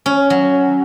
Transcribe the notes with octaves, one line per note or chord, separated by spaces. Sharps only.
C#4
F#3